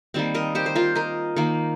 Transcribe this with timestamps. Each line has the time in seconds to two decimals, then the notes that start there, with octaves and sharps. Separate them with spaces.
0.14 D#3 G3 A#3 C4
0.34 A#4 D#5
0.55 G4 C5
0.66 C5
0.75 F4 A#4
0.95 A#4 D#5
1.36 D#3 A#3